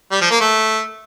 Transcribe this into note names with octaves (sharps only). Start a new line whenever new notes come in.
G3
F3
A#3
A3